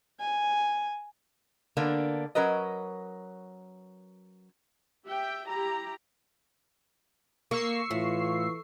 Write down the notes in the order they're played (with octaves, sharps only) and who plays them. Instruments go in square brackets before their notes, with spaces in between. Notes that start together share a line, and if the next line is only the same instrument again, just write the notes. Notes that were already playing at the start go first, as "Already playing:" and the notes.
[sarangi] G#5
[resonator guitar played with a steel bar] D3 A#3 B3 D4
F#3 C#4 A#4 B4 D#5
[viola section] G4 E5 G5
E4 G4 A#5
[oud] A#3 [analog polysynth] C#6 E6 C7
[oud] A2 [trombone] E3 [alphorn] F4